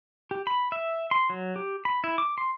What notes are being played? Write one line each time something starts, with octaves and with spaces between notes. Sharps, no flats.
G4
B5
E5
C6
F#3
G4
B5
E4
D6
C6